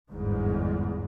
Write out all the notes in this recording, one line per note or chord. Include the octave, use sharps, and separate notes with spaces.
G1 E2 G#2